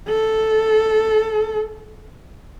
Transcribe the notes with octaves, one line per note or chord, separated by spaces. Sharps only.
A4